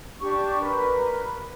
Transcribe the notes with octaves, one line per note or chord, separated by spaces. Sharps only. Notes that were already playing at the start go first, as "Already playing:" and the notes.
D4 G4 C#6
A#4 B4